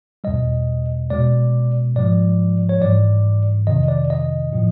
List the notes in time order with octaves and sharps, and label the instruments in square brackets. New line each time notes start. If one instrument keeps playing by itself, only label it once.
[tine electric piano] E2 B2 G3 D#5
B2 G#3 D5
G#2 F3 G#3 D5
C#5
G#2 E3 G3 D5
F2 C3 D#3 D#5
D5
D#5
A2 F3